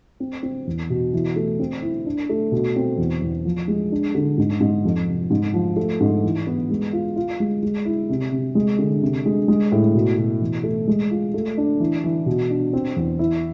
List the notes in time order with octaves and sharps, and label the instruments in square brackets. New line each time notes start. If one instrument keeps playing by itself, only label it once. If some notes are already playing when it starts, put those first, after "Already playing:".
[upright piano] C4
C4
E2
B2
E3
A3
C4
E4
D4
A3
B2
C4
E2
E2
F3
G#3
D4
D3
G#2
G#2
F2
C3
G#2
F3
A3
G#2
E3
B3
G#3
F4
F4
G#3
G#3
E4
C3
C3
G#3
D3
C3
G#3
G#3
A2
B2
B2
E3
A3
G#3
F4
A3
D4
E3
E3
B2
D4
C4
E2
E4